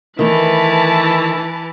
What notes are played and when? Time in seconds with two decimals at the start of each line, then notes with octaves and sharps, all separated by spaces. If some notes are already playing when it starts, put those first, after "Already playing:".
0.19 D#3 E3 A3 B4 A5